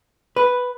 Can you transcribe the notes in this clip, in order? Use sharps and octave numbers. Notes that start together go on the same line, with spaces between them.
B4